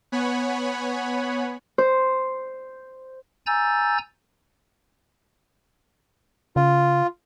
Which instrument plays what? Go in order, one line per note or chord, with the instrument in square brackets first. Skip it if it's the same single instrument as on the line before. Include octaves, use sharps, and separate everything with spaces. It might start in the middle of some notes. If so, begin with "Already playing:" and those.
[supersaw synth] B3 C#5 F#5 G#5 B5
[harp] C5
[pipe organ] G#5 A#5 E6 G6 A6
[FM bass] C#3 [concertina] F4